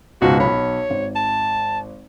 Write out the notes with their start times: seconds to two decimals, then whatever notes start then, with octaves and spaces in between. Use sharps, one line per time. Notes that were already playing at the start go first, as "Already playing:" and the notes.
0.22 C#2 G#2 B2 F#4
0.40 B1 C#5 B5
0.90 G#1
1.16 A5